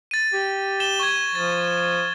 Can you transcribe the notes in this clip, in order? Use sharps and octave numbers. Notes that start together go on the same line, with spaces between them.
A6 D#7
G4
A6 E7 G7
C#6 G#6
F3 A6